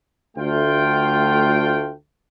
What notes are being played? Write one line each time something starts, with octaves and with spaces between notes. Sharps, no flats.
D2 A3 F4 G5